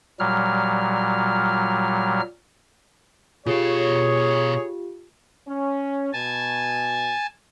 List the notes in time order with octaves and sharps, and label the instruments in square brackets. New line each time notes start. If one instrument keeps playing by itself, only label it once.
[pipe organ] A#2 F#3 G3 F6
[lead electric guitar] B2 F5 [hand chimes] F4 G4 [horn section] G#4 C#5
[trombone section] C#4
[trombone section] B2 [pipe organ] G#5 A5